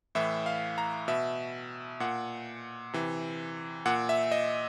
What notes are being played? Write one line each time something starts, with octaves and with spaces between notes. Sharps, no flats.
A2 E3 E5
F5
A#5
B2 E5
A#2 F#5
C3 E3
A#2 F#5
E5
D#5